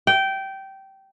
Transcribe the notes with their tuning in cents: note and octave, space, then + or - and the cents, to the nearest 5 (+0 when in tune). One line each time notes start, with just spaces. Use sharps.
G5 -15